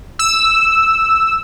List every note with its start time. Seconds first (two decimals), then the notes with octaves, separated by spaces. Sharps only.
0.19 E6